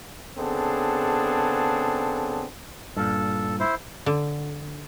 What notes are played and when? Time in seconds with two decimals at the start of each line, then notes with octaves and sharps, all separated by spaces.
0.38 C#3 B3 C4 D4 G#4 A4
2.97 G2 A#2 A4
3.60 E4 C5
4.06 D3